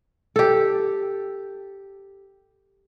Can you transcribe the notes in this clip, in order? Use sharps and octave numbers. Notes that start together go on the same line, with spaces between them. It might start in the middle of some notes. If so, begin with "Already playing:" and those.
G4 A4